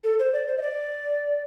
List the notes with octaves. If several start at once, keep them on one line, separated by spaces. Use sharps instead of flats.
A4
C5
D5
C5
D#5
D5